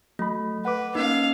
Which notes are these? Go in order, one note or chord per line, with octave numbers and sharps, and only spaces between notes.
F#3 A3 B5
B4 F#5 D6
A#3 C#4 D#4 F5